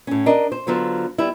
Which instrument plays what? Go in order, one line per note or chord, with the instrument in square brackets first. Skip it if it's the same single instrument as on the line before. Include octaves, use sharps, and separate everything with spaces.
[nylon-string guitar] A2 C#4
D4 A#4 D#5
C5
D3 F#3 B3 F4 C5
G3 B3 E4